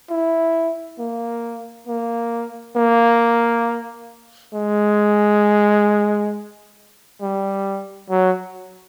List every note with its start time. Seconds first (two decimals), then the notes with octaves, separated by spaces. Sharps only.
0.10 E4
0.99 A#3
1.87 A#3
2.76 A#3
4.54 G#3
7.21 G3
8.10 F#3